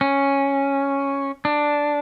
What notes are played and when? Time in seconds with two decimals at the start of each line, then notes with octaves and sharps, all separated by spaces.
0.01 C#4
1.45 D4